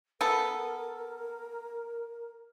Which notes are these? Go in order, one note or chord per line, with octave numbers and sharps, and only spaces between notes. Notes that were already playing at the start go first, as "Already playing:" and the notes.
B3 A4 A#4